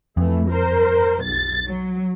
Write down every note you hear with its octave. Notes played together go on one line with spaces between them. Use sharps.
F2 E3 A3
A#4 C5
B1 A6
F#3